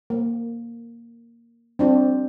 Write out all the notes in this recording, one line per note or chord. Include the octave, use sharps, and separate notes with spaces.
A#3
C4 D4 F4